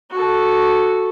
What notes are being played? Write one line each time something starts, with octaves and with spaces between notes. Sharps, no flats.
F#4 A4